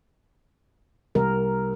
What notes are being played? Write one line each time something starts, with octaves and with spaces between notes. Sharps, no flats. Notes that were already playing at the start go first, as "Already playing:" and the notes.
C2 A#4